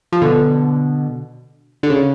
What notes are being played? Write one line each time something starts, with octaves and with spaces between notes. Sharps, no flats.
F3
B2 D3
D3
C#3